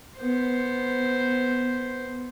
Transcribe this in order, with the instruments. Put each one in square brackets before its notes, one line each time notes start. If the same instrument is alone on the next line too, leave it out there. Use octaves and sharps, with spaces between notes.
[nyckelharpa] B3 C5